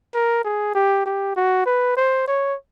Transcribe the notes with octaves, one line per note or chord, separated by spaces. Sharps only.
A#4
G#4
G4
G4
F#4
B4
C5
C#5